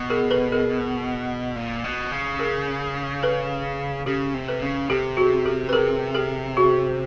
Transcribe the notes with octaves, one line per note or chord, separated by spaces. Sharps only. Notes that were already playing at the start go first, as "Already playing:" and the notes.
Already playing: B2
G#4 A#4
A4 B4
G#4 A#4
A#2
B2
C#3
G#4 A#4
A4 B4
C#3 G4 A4
C3
A4 B4
C#3
C3 G4 A4
F#4 G#4
G4 A4
B4
G#4 A#4
G4 A4
F#4 G#4